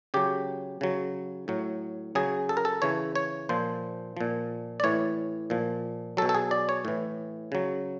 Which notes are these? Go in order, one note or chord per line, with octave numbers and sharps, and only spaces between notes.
C#3 F#3 G4
C#3 F#3
A2 F#3
C#3 F#3 G#4
A4
A#4
A4
C#3 E3 C#5
C#5
A#2 F3 C5
A#2 F3
D5
A2 E3 C#5
A#2 F3
B2 F#3 A4
A4
G#4
D5
C#5
A2 E3
C#3 F#3